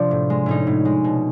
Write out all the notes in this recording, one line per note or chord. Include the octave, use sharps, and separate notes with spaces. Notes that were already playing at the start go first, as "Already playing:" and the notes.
Already playing: C3 F3 D4
A2
G#3
A2 C#4 D#4
A2
G#3
B2